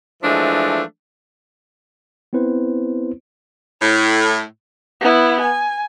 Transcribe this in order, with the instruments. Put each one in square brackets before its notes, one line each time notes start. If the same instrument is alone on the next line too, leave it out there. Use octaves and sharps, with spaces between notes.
[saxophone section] E3 F3 G#3 A3 D4
[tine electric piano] B3 C4 E4 B4 C5
[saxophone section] A2
[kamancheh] B3 E4
G#5